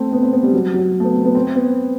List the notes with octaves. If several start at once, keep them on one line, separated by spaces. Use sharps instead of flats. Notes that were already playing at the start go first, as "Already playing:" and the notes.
Already playing: A3 C4
B3
C4
B3
G3
F#3
F#3
A3
B3
C4
B3
C4
B3